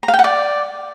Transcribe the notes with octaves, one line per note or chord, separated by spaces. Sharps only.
A#5
F5
G5
F#5
D5